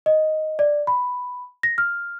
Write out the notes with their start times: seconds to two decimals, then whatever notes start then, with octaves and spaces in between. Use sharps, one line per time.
0.06 D#5
0.59 D5
0.87 B5
1.63 A#6
1.78 F6